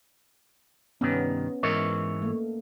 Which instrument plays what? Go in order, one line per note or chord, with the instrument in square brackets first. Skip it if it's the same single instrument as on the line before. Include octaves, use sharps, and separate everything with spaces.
[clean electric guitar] C2 G2 D#3 [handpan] B3 C#4
[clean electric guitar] G#2 E3 C#5 [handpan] A#4 D#5 E5
[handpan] A3 A#3